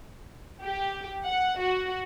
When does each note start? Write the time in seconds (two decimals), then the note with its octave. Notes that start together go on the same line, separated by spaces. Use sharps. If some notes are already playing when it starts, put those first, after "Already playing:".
0.63 G4
1.25 F#5
1.60 F#4